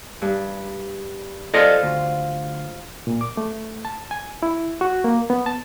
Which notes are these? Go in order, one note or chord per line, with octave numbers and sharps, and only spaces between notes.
G2
F4 A4 C5 D5 D#5 F5
D2
A#2
D6
A3
A5
G#5
E4
F#4
A#3
B3
A5